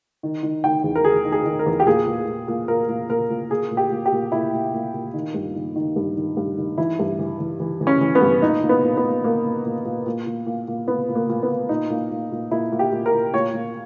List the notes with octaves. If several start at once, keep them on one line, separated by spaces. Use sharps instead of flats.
D#3
D#3
D#3 G5
E2
A#4
D#3 G#4
D#3
G#4
D#3
A#4
E2
G4
A#2 G#4
A#2
A#2
A#2
A#2 A#4
A#2
A#2 A#4
A#2
A#2 G#4
A#2
G4
A#2
G4
A#2
A#2 E4
A#2
A#2
A#2
D#3
G2
D#3
D#3
G2
D#3
G2
D#3
E3 E4
G2
E3
E3
E3
E3
C#4
E3
B3
G2
A#2 D#4
A#2
B3
A#2
B3
A#2
A#2 A#3
A#2
A#2
A#2
A#2
A#2
A#2
A#2
A#2 B3
A#2
A#3
A#2
B3
A#2
A#2 D#4
A#2
A#2
A#2
A#2 E4
A#2
G4
A#2
A#4
A#2
A#2 C#5
A#2